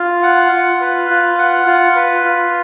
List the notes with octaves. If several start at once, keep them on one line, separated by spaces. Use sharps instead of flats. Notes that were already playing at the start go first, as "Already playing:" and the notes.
Already playing: F4
F#5
F4
B4
F4
F#5
F4
B4
F4